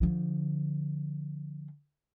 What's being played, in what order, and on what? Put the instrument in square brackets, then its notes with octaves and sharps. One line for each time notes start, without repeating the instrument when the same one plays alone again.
[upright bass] D3 F3